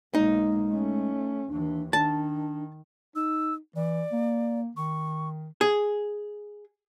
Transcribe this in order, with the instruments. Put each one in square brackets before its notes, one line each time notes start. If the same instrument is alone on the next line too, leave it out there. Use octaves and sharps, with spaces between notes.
[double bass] B1 A#3 [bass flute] G#3 [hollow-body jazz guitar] D#4
[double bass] A3 C#4
[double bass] D#2 E3 [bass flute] D4
[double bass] D#3 [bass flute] D4 [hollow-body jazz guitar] A5
[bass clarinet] D#4 [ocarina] E6
[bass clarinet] E3 [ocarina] D5
[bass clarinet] A#3
[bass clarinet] D#3 [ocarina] C#6
[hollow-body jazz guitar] G#4